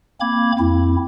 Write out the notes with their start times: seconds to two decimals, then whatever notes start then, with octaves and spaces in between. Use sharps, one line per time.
0.20 A#3 C4 B5 D6 G#6
0.59 F2 C4 E4